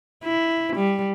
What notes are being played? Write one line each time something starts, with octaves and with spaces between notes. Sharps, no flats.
E4
G3